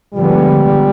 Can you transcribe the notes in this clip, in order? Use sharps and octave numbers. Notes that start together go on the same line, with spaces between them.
D3 F3 G3 G#3 B3